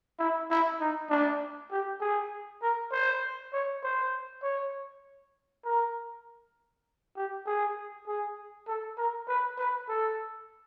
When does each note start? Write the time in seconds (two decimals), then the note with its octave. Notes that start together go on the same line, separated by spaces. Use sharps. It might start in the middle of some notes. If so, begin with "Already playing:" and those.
0.19 E4
0.51 E4
0.80 D#4
1.10 D4
1.72 G4
2.01 G#4
2.62 A#4
2.92 C5
3.53 C#5
3.84 C5
4.43 C#5
5.64 A#4
7.17 G4
7.47 G#4
8.07 G#4
8.68 A4
8.98 A#4
9.28 B4
9.58 B4
9.89 A4